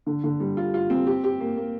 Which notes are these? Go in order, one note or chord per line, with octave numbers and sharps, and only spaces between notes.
D3
D3
G3
F4
F4
C4
G4
G4
A#3
A#3